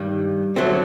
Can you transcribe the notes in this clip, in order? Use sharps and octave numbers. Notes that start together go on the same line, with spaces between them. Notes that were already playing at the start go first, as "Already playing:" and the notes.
Already playing: G2 D#3 G3
D2 D3 F#3 A3 C4